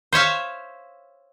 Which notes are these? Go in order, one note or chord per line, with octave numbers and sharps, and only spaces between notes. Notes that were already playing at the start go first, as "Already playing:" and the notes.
C5 C#5 E5 F5